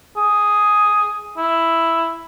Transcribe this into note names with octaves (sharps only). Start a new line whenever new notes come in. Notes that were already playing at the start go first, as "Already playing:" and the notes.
G#4
E4